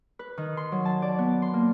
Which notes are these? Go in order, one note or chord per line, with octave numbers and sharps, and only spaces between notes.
B4
D#3
C6
F#3
A5
D5
B3
C6
A#3